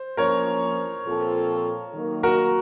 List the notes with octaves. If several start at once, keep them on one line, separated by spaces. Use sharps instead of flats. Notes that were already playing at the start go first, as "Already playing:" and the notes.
Already playing: C5
F3 A#3 C#4 A#4 C#5
A#2 F3 C4 F4 A4
D#3 F#3 A#3
F#4 A#4